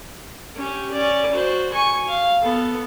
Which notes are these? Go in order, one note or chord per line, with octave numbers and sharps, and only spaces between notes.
C#4 G4
C#4 D5
F#4 C5
G#5 C#6
F5
B3 A4